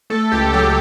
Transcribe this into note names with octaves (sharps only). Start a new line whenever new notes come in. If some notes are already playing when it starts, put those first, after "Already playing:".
A3 A4
C#2 G4
F#3 G4